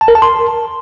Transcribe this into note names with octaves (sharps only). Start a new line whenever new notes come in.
A5
A#4
A5
C6